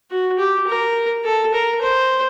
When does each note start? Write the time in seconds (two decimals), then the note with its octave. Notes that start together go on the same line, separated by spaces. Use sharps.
0.11 F#4
0.39 G4
0.68 A#4
1.25 A4
1.54 A#4
1.82 C5